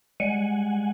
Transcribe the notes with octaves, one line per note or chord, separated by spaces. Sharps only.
G3 G#3 F#5 G#5